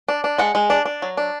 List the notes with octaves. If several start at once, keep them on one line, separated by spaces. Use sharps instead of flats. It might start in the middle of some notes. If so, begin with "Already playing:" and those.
D4
D4
G#3 F#5
G#3
D4
D4
F#3
D4